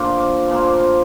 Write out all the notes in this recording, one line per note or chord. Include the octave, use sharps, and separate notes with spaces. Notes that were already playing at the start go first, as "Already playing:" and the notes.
Already playing: A#2 D3 F3 A#3 C6
D6
A#2 F3 A#3 C6
D6
C6